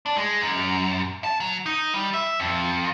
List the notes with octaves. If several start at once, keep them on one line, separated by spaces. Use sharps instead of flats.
D4
G#3
F#2
A5
F#3
D#4
G3
E5
F2